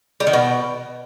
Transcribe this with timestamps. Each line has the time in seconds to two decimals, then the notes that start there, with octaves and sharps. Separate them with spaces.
0.20 G3
0.27 D#3
0.33 B2